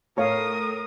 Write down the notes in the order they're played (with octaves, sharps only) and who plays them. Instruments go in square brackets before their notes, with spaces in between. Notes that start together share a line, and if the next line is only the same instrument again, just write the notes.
[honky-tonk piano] A2 [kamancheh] A#4 D#6 [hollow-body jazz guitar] C#5 [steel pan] F5 A5